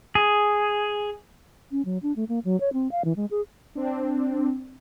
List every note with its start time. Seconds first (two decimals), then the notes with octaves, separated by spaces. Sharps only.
0.15 G#4
1.71 C#4
1.85 F#3
2.02 D4
2.16 A3
2.29 A#3
2.45 F#3
2.60 C#5
2.73 C4
2.91 F5
3.05 E3
3.16 G#3
3.31 G#4
3.75 C4 D4